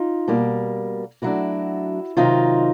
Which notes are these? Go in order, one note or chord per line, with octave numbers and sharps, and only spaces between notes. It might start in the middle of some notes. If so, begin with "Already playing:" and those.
Already playing: D#4 F4
B2 G3 A#3
D3 F#3 A3 D4 E4 F#4
C3 D#3 F#3 D#4 F4